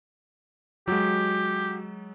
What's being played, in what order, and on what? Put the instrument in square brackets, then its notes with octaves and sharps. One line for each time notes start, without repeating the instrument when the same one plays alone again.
[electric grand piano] F#3 G#3 [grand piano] F#4 [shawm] G4